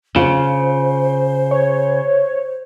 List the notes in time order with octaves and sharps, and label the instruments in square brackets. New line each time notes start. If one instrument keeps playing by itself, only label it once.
[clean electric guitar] C#3 [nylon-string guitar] F4 [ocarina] C5
[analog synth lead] C#5